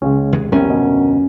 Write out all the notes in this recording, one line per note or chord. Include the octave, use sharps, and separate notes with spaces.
C#2 C#3 G#3 C#4
D#2 C3 G#3
C2 F2 C3 B3 C#4 A#4
D2 B2